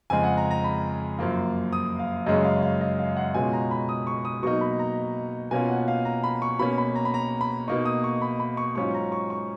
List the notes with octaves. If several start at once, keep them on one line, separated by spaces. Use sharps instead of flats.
F2 C#3 G#3 G#5
F#5
A#5
A#5
B5
F#2 F3 A#3 F4
D#6
F5
F#2 C#3 G#3 C#4 D#5
F5
F5
D#5
F5
F#5
B2 G#3 C#4 F4 G#5
A#5
B5
D#6
C#6
D#6
B2 F#3 A#3 D#4 C#6
B5
A#5
B2 A#3 C#4 F4 G#5
F#5
F5
A#5
B5
C#6
B2 A#3 C#4 B5
B5
A#5
B5
A#5
B5
B2 A#3 D#4 C#6
D#6
C#6
B5
B5
C#6
G#2 F#3 C#4 F4 C#6
A#5
C#6
C#6